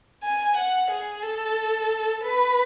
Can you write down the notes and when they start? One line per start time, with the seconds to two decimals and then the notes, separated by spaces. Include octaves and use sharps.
0.23 G#5
0.57 F#5
0.90 G#4
1.23 A4
2.23 B4